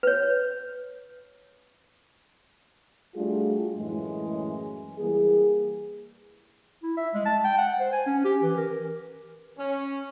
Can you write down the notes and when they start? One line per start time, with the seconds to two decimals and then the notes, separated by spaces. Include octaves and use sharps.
0.03 B4 C#5
3.15 G3 A3 D4 F4 F#4 G#4
3.76 F#2 A2 E3 G#3
4.99 E3 G3 A#3 G#4
6.83 E4
6.97 E5
7.14 G#3
7.26 A5
7.44 G5
7.58 F#5
7.80 C5
7.93 G#5
8.06 C#4
8.25 G4
8.43 E3
8.57 A#4
9.59 C#4